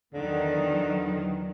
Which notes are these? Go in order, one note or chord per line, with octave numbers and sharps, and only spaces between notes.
E2 D3 D#3 F#3